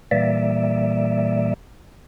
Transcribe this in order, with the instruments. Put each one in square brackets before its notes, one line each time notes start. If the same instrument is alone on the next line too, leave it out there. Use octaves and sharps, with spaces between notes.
[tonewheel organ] A#2 E3 G3 A#3 D5 E5